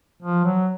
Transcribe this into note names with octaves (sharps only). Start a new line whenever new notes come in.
F3
F#3